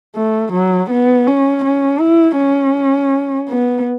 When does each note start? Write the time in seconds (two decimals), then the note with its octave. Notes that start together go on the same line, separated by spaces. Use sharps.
0.15 A3
0.53 F#3
0.91 B3
1.27 C#4
1.65 C#4
2.01 E4
2.38 C#4
3.49 B3